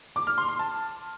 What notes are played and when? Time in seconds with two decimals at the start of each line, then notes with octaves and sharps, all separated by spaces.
0.16 D6
0.27 F6
0.38 C6
0.49 C6
0.59 A5